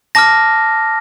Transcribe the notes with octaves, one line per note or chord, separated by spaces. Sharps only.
A5 D6 F6 A#6